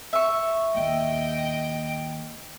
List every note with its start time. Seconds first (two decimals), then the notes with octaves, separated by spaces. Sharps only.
0.13 E5 C#6
0.74 D#2 A#2 D#5 G5